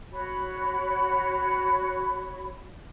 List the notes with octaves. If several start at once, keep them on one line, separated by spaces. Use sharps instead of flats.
F#4 C#5 B5